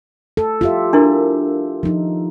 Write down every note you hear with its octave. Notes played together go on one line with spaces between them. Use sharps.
A4
F4 G4 E5
D4 E4 A#4
F3 D#4